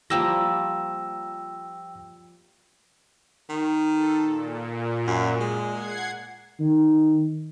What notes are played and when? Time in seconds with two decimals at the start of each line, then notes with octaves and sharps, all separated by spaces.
0.10 F3 G3 A#3 G5 E6 A#6
3.50 D#3
3.92 A4
4.22 A#2
5.07 F#2
5.40 G#3
5.71 F#5 G#6 C7
6.60 D#3